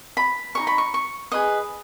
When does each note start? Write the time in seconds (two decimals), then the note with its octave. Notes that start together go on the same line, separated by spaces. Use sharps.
0.17 B5
0.55 D#4 G#4 C#5 C#6
0.67 B5
0.78 C#6
0.94 C#6
1.32 G#4 B4 D#5 D#6